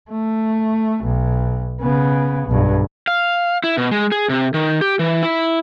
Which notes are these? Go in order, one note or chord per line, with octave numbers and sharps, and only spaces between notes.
A3
B1
C#3 B3
B1 G2
F5
E4
B2
G#3
G#4
C3
D#3
G4
E3
E4